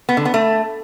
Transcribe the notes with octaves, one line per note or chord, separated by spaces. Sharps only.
B3
D3
B3
A3